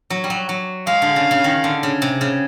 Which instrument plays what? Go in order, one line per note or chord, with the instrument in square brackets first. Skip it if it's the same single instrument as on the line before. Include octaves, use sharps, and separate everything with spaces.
[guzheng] F#3
G3
F#3
F#3
[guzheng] G#3 [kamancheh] F5
[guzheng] D3
C#3
C#3
D#3
D3
C#3
C3
C#3